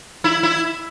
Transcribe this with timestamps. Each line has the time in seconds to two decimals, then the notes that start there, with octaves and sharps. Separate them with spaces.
0.24 E4
0.43 E4